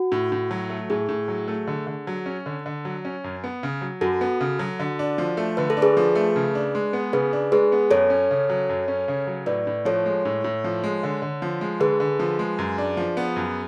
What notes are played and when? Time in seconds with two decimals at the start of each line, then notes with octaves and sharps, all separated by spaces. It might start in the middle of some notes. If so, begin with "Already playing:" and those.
Already playing: F#4
0.12 A2
0.32 A2
0.51 F#3
0.70 A3
0.90 A2 G#4
1.09 A2
1.28 F#3
1.48 A3
1.67 D3
1.87 D3
2.07 F#3
2.26 C#4
2.46 D3
2.66 D3
2.85 F#3
3.05 C#4
3.24 F#2
3.44 B3
3.63 C#3
3.81 F#3
4.01 F#2 F#4 A4
4.21 B3
4.41 C#3
4.59 F#3
4.80 D3
4.99 D4
5.18 F3
5.37 A3
5.57 D3 B4
5.70 A4
5.77 D4
5.82 G#4 B4
5.97 F3
6.15 A3
6.36 C#3
6.55 D4
6.75 G#3
6.93 B3
7.13 C#3 G#4 B4
7.33 D4
7.52 G#3 G#4 B4
7.72 B3
7.91 F#2 A4 C#5
8.10 C#4
8.31 C#3
8.49 F#3
8.69 F#2
8.88 C#4
9.08 C#3
9.27 F#3
9.46 A2 B4 D5
9.67 A2
9.85 F3 A4 C#5
10.06 G#3
10.25 A2
10.44 A2
10.64 F3
10.84 G#3
11.03 D3
11.22 D3
11.42 F3
11.61 G#3
11.80 D3 G#4 B4
12.00 D3
12.19 F3
12.39 G#3
12.58 F#2
12.78 D4
12.97 F3
13.17 B3
13.36 F#2